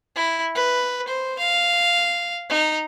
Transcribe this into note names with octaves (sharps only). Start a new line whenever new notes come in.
E4
B4
C5
F5
D#4